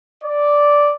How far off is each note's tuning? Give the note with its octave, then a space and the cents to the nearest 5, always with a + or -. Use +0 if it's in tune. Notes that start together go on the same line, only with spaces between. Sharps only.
D5 -5